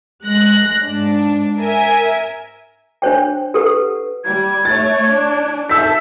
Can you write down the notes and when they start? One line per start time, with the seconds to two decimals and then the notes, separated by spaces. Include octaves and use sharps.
0.25 G#3 F#6 A#6
0.84 G#2 D4
1.59 A#4 E5 G#5
3.02 D4 C5 C#5 G5
3.54 G4 A4 B4 F#5
4.24 G3 G#6
4.65 A3 C#5 A6
5.09 D4
5.69 A4 E5 E6 G6 B6